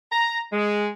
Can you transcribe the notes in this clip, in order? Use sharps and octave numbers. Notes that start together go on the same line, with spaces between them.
A#5
G#3